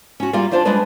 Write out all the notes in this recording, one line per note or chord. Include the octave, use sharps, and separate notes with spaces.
C#4 F#4
G3 A#3 F4 D5 F5
D4 F4 C5 D5 F5
G3 G#3 D4 B4 D5